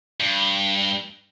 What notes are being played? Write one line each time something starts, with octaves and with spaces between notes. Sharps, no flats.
G2